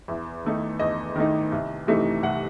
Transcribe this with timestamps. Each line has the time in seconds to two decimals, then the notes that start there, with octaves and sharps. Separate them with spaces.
0.08 E2 E5
0.45 D#3 A3 D#4
0.80 E2 D#5
1.16 D#3 A3 D#4
1.52 C2
1.87 C3 E3 A3 D#4
2.23 C2 F#5